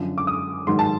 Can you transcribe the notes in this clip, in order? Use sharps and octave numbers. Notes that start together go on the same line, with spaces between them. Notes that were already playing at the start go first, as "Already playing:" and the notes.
Already playing: F#2 D3 F3
D6
D#6
G#2 D#3 F#3 C6
A5